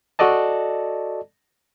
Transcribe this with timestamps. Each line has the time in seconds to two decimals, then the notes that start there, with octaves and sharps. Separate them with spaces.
0.19 F#4 A4 D5 D#5 A5